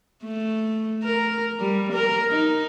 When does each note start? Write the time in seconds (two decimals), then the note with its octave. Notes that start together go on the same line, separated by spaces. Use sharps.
0.25 A3
1.03 A#4
1.60 G3
1.93 A#4
2.30 D#4